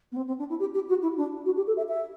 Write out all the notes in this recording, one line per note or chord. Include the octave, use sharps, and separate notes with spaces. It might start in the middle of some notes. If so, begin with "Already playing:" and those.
B3
C4
C4
D4
E4
G4
G4
F#4
E4
D4
F#4
G4
A4
E5
E5